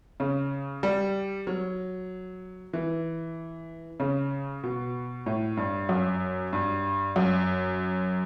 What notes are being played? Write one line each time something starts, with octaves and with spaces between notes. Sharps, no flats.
C#3
G3
F#3
E3
C#3
B2
A2
G2
F#2
G2
F#2